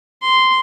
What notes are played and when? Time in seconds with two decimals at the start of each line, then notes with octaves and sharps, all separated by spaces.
0.22 C6